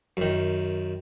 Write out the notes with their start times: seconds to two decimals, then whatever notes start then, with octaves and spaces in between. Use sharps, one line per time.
0.17 F#2 D#3